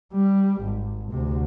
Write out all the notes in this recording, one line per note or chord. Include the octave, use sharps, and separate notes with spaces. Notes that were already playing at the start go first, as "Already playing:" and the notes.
G3
G#1
D2 C3